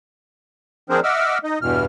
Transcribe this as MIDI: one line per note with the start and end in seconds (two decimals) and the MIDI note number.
0.90 1.00 53
0.90 1.00 60
0.90 1.00 62
0.90 1.00 68
0.90 1.00 70
0.90 1.00 72
1.04 1.38 75
1.04 1.38 76
1.04 1.38 78
1.04 1.38 86
1.04 1.38 88
1.04 1.38 89
1.44 1.59 63
1.44 1.59 75
1.62 1.85 40
1.62 1.85 43
1.62 1.85 47
1.62 1.85 52
1.62 1.85 89